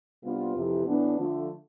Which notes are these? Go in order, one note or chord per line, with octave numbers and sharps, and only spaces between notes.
C3 G3 B3 D4 F4
F2 C3 E3
A2 E3 B3 D4
D3 F3 A3